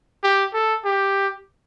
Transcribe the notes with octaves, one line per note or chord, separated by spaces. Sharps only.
G4
A4
G4